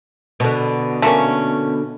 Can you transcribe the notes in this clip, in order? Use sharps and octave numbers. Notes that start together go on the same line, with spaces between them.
B2 D3
A3 A#3 C#4